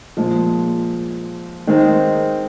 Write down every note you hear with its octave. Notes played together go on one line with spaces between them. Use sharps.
A#2 F3 G#3
D#3 G#3 C4 D#4